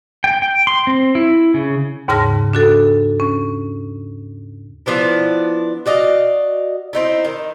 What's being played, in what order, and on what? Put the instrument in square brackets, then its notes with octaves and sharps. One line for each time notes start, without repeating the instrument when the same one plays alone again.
[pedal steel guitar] G5
G5
C6
C4
E4
C#3
[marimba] D#2 G#2 C#3 A5 F6 A#6
D4 F#4 A4
C#4
[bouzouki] F3 B3 D4 E4
F#4 D5 D#5 F5
C4 D#4 E4
D#3